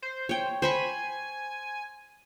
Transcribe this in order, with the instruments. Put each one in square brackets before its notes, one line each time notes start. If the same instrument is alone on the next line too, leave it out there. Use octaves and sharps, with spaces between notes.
[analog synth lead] C5
[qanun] C#5 G5
[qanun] C5 B5 C#6 [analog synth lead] G#5